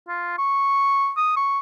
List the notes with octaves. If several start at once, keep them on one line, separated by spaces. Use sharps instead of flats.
F4
C#6
D#6
C#6